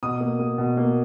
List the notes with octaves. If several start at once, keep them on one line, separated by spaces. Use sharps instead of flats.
B2 D#6
A#3
A#3
B2
A#3